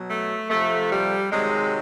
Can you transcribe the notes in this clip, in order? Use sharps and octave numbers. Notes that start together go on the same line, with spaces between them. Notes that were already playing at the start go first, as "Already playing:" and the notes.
Already playing: B2 F#3
A3
C3 F3 A3
G3
C3 D#3 F#3 G#3